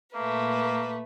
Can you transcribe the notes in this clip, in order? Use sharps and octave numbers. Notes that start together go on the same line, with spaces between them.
A#2 A3 A#3 B4